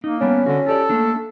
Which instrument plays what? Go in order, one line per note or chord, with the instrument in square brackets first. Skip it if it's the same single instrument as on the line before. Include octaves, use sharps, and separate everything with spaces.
[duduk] A#3 [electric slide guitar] D#4
[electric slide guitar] G3 B3 D4 [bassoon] C#4
[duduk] D3 [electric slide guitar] F#4
[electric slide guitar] F4 G4 D5 [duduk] A4
[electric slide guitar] A3 A#3 D4